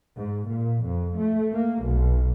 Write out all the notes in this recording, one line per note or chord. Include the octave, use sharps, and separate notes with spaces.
G#2
A#2
F2
A3
A#3
B1